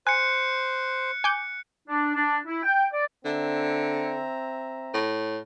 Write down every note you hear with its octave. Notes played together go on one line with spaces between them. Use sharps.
C5 G#5 F#6 C#7
G#5 D6 G6
D4
D4
E4
G5
D5
D3 C4 E5 A#5
A2